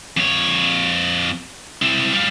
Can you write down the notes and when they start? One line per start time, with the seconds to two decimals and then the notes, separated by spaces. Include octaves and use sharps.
0.17 F2 C#5
1.82 C4 E4
2.13 G3 F5